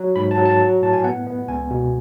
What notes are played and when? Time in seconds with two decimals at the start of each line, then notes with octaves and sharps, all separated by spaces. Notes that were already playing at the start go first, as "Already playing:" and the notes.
Already playing: F#3
0.16 G#2 B5
0.31 A5
0.37 F#3
0.45 A5
0.60 F#3
0.82 A2 A5
0.93 G#5
1.04 B3 F#5
1.27 B3
1.48 C#2 G#5
1.70 B2